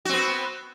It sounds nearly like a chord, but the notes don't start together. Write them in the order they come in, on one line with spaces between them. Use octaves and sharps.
F#4 C4 B3